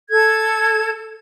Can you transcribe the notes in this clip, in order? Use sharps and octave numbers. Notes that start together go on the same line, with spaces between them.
A4 G#6